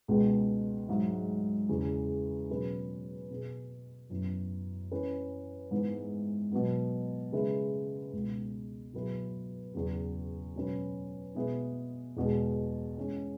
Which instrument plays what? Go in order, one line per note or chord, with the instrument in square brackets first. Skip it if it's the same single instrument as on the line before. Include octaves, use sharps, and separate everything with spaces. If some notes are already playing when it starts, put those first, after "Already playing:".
[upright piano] C#2 B2 G#3 B3
G#2 F#3 E4
E2 C#3 E3 G#3
B2 F#3 C#4 G#4 B4
B2 B3 G#4
F#2 E3 B3
E3 C#4 E4 B4
G#2 E3 B3
B2 F#3 B3
C#3 G#3 E4 B4
C#2 B2 B3
B2 F#3 E4 G#4 B4
E2 C#3 F#3 B3 G#4
B2 F#3 C#4 F#4 B4
B2 B3 E4 G#4
E2 B2 G#3
E3 G#3 C#4